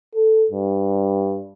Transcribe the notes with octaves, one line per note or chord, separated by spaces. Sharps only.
A4
G2